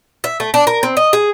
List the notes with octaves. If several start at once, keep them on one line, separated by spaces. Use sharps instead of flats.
E5
A3
D4
A#4
C4
D#5
G#4